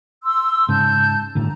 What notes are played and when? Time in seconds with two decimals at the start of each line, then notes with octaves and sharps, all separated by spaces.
0.22 C6 E6
0.69 G#2 C#3 A5 G6
1.35 G1 A2 D3 A#5